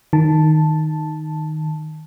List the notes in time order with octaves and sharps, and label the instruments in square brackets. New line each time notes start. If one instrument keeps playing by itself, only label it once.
[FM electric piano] D#3 A5